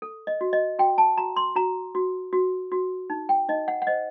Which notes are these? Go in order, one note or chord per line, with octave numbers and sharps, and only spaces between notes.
A4
D#5
F#4
D#5
F#4 G5
A5
F#4 A#5
C6
F#4 A#5
F#4
F#4
F#4
D#4
G5
D#4 D#5
F#5
F#5
C5 D#5